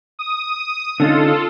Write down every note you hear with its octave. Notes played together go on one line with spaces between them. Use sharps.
D#6
D3 C#4 D#4 F4 A4